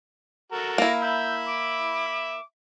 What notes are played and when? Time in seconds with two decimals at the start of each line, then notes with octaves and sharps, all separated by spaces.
0.52 F#4 A4 A#4
0.78 A#3 E4 A#6
1.02 E5 B5 G6
1.46 D6